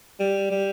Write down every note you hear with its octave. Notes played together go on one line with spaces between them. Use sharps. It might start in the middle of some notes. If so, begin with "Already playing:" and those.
G3
G3